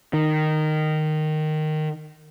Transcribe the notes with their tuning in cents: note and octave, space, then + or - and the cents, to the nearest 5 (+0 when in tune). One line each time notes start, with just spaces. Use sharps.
D#3 -10